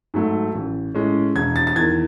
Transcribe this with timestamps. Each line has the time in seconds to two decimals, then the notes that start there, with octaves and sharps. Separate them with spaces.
0.14 G#2 F#3 A3
0.55 A1
0.95 A2 G#3 C#4
1.36 E1 G#6
1.56 A6
1.67 A6
1.76 E2 D#3 G#6